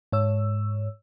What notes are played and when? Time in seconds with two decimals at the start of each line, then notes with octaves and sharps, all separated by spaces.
0.12 G#2 C#5 E6